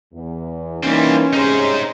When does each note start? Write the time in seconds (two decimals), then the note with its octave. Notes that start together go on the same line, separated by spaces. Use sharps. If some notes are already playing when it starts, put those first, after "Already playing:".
0.13 E2
0.83 E3 G3 A#3 C4 C#4 D#4
1.33 C3 D#4 G#4 C5 C#5